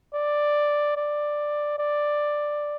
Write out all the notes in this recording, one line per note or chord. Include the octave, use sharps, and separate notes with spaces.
D5
D5
D5